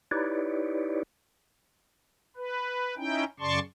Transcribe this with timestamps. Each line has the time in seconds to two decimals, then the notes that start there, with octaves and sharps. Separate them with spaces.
0.11 D#4 E4 G4 B4 C#5 D5
2.37 B4
2.97 C#4 D#4 E4 G5
3.40 F#2 C#3 D5 A5 C6 C#6